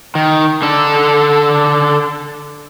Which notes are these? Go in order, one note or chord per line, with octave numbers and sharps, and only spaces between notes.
D#3
D3 A4